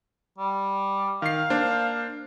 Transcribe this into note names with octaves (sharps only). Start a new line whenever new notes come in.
G3
D#3 F5 C7
A#3 D4 C5